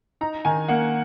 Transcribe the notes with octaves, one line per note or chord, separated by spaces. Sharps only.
D#4 A#5
D#3 G#5
A#3 F#5